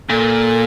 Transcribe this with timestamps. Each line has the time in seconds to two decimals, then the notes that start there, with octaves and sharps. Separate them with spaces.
0.09 A#2 A4